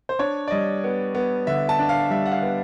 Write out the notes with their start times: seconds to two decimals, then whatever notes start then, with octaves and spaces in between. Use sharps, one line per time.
0.09 C5
0.19 D4 C#5
0.48 D5
0.51 G3 D#5
0.84 B3
1.15 B3
1.47 D3 E5
1.69 A5
1.79 D4
1.89 F5
2.10 G3 E5
2.26 F#5
2.32 F5
2.42 B3